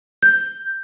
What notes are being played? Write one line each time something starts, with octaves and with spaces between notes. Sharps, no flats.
G6